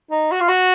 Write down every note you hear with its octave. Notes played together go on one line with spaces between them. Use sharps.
D#4
F#4
F4
F#4